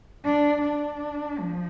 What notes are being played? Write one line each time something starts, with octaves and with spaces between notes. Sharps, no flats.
D4
D4
F3